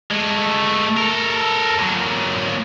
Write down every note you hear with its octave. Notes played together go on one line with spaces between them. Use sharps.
G#3 A3
A4 A#4
A#2 F#3